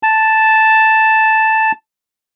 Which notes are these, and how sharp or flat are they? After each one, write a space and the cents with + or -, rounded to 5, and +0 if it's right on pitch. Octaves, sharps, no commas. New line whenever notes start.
A5 +0